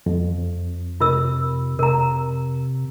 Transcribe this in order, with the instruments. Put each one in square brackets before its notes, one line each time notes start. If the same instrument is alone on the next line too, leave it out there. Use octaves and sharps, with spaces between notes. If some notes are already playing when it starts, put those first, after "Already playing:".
[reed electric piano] F2
[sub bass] C3 [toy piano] F4 A#4 E6
[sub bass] C3 [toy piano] A#4 A#5